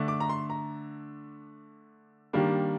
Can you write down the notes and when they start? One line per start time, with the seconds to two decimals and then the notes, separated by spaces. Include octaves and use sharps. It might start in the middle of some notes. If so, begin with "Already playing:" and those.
Already playing: D3 A3 D4
0.08 D6
0.20 A#5
0.29 C6
0.50 A#5
2.33 D#3 G3 A#3 D4